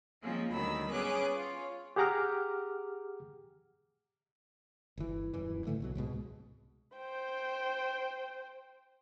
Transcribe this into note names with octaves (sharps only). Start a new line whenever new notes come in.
F3 G#3 A#3 C4 C#4
D2 D#3 F#3 G3 B5 E6
G3 B3 C#4 G#4 D6 F#6
F4 C#5
G4 G#4 F#5 A#5 D6 F6
G1 E3
D#1 F#2 E3
G#2 D3 E3 A3
B1 B2 F#3
C2 G#2 B2 G#3
C5 G5